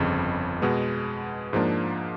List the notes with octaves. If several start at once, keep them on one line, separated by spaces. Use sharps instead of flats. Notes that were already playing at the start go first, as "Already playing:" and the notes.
Already playing: G1 F2 C#3
B2 G#3 B3
G#2 F3 A#3 D4